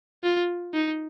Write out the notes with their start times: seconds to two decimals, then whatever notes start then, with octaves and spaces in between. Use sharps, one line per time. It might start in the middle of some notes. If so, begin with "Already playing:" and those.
0.24 F4
0.74 D#4